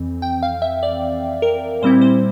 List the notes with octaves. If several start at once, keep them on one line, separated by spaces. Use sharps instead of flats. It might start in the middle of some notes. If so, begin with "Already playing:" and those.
Already playing: F2 E3 C4
G5
F5
E5
D5
A#4
A#2 G3 C4 E4 C5
C5